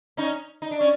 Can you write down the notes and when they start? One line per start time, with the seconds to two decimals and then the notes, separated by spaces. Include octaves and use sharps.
0.17 C#4 D#4
0.62 D#4
0.71 D4
0.81 C#4